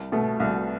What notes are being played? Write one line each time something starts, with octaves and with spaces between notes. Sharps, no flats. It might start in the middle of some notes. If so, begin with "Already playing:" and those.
Already playing: C2
B2 A3
C2